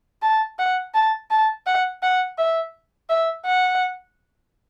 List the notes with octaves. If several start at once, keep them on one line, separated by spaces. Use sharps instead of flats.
A5
F#5
A5
A5
F#5
F#5
E5
E5
F#5